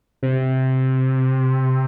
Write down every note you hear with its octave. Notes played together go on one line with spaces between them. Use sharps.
C3